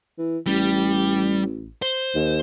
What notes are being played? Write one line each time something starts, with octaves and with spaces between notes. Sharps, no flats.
E3
A1 G3
C5
D#2